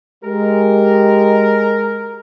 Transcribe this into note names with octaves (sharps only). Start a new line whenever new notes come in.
G#3 G4 A#4